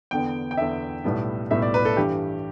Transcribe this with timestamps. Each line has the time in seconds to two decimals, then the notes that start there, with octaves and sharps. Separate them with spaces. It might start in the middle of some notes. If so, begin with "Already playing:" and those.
0.11 E2 D3 B3 G5
0.51 G5
0.57 E2 D3 B3 E5
1.04 B1 A2 G3 B3
1.51 B1 A2 G3 B3 E5
1.62 D5
1.74 B4
1.85 A4
1.97 G2 E3 G3 G4